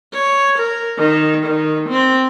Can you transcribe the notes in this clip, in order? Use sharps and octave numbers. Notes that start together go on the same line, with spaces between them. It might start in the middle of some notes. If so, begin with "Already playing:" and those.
C#5
A#4
D#3
D#3
C4